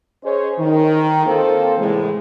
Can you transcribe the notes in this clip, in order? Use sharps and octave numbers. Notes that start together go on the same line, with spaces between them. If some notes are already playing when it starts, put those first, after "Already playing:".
C#4 G#4 C5 C#5 D#5
D#3
A#3 C4 F4 A4 C5
A2 C3 E3 G#3